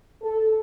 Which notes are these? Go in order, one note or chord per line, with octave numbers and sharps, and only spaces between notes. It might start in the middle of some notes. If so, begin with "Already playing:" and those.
A4